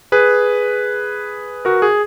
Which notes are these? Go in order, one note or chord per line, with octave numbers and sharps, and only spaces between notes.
G#4 B4
F#4 A#4
G#4